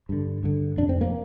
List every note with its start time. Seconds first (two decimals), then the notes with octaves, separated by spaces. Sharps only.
0.09 G2 D3
0.43 G2 D3
0.77 F2 C3 D4
0.89 C4
1.01 A#3